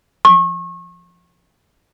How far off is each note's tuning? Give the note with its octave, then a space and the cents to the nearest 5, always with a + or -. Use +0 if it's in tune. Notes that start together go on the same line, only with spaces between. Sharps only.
C#6 -35